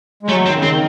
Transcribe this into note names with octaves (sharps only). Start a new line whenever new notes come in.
G#3
F#3 A3
D#3 C4
C#3
D#3 C4